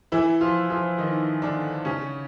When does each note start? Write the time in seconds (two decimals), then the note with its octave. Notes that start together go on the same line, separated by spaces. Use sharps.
0.12 E3 E4
0.41 F3 F4
0.70 F3 F4
0.98 D#3 D#4
1.42 D3 D4
1.85 C#3 C#4